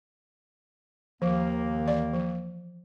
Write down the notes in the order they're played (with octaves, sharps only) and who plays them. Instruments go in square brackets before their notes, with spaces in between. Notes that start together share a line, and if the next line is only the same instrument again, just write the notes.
[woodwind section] D#2 D#3 A#3 [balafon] F3
[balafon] E3 D5
F3